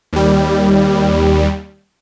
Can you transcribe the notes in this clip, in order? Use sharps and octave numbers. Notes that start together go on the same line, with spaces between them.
D#2 G3